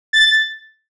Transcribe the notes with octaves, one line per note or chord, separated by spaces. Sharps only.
A6